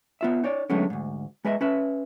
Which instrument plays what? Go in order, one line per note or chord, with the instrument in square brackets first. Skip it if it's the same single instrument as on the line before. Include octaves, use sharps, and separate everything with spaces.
[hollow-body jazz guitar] B3 F4 E5
D#4 C#5 D5
D3 F#3 G#3 A3 B3 C#4
D2 G#2
G#3 B4 D#5 E5
C#4 B4 E5